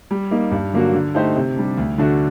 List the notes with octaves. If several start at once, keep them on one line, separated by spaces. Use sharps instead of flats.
G3
A#3 D#4
G2
D3 F#3 A#3 F#4
D3
A3 D#4 G4 C5
C3
G3 D4
D2
D3 A3 D4 F#4